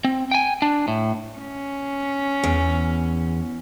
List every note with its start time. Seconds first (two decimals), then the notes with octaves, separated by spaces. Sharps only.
0.05 C4
0.31 G5 G#5
0.62 D4
0.88 A2
1.39 C#4
2.43 E2